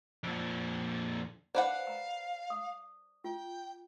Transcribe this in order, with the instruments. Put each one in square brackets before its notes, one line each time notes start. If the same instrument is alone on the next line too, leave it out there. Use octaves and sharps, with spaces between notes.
[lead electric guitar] F2 A#2
[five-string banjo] D4 B4 F#5 [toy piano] C5 [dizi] F5
[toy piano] A#5
D#6
[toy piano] F4 [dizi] G5